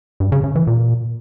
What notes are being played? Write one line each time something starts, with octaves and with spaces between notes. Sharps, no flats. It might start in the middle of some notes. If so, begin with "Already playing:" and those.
G2
C#3
C#3
E3
A#2